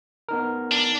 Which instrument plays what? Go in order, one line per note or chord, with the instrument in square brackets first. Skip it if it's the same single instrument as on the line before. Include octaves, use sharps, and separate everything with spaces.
[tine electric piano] B3 D#4 A#4
[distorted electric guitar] D4